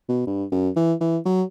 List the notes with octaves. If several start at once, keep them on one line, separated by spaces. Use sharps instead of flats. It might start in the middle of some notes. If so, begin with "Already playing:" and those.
B2
G2
F#2
E3
E3
F#3